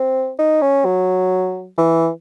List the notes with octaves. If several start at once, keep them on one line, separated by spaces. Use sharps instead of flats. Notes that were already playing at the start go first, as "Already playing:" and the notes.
Already playing: C4
D#4
C#4
F#3
E3